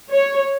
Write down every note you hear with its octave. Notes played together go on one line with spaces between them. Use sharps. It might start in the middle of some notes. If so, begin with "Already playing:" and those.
C#5